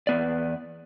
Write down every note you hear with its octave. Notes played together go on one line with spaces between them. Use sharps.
E2 B3 D5